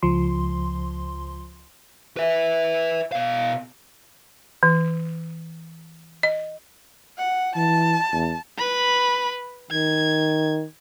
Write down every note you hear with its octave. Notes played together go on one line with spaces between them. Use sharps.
C#2 F3 C6
B4 E5
B2 F5
E3
D#5
F#5
E3 A5
E2
B4 B5
D#3 G#6